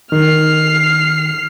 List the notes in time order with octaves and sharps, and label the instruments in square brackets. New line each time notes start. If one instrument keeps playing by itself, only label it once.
[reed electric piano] D#3 [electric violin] F6 C7